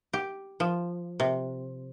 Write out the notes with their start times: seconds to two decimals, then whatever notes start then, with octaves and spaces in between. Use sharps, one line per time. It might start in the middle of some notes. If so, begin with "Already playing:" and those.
0.13 G4
0.60 F3
1.20 C3